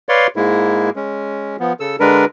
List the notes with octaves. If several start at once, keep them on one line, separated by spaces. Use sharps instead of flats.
B4 C#5 D5 F5 C6
G#2 G#3 A#3 E4
G#3 C#4
F3 B3
C#3 A4 E6
D3 G#3 D4 A#4 B4